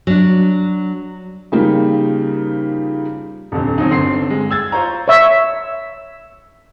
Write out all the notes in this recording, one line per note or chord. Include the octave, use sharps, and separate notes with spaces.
F#3 D4
C#3 F3 G3 A#3 D#4
D#1 F2 D3
F#3 C4 C#4 D#4
G1 D3 C4 C6 C7
G#3
E6 G#6 A6
F4 C5 C#5 A#5
C#5 E5